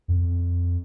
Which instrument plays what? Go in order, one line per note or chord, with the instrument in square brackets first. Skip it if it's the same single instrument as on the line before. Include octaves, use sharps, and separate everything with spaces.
[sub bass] F2